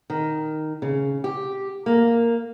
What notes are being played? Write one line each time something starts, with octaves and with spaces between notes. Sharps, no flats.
D#3
C#3
G4
A#3